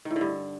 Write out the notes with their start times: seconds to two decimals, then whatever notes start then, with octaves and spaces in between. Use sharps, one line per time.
0.05 D#3
0.10 A2
0.16 D3
0.21 G2